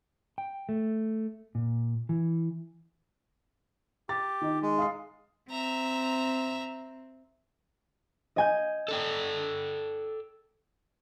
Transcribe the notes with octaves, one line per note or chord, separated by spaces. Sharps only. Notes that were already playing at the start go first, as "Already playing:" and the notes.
G5
A3
A#2
E3
G4 A6
D#3 D#4
G#3
F5 D#6 C7
C4 E5 A#5
D#5 G#5 G6
A4 D5 G5